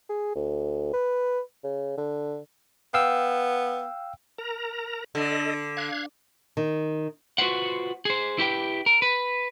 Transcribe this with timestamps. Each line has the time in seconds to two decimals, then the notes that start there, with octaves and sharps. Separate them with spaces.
0.09 G#4
0.36 D2
0.93 B4
1.64 C#3
1.98 D3
2.94 B3 F5 G5 E6
4.38 A#4 A#5
5.15 D3 A4 D#5
5.77 F5 F#6 G#6
6.57 D#3
7.38 F4 F#4 G#4 B4 C5 F#5
8.05 G#4 C5
8.38 E4 G4 B4 G5
8.86 A#4
9.02 B4